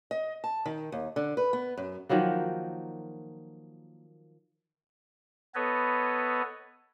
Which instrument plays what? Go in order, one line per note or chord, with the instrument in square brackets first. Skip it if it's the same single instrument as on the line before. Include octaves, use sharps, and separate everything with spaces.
[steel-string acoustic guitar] D#5
A5
D#3
D#2
D3
B4
B3
F#2
[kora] D#3 F3 F#3 A#3
[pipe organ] B3 A4 B4 C#5 D#5